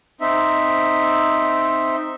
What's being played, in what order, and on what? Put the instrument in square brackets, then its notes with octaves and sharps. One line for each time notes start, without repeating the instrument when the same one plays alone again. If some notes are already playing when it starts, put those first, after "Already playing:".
[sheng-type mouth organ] C4 D#4 E5